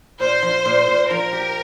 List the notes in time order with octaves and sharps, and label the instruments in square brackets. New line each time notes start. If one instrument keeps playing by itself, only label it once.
[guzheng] A#2 [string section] C5
[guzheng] F3
A#2
A#2
[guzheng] F3 [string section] A#4
[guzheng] G4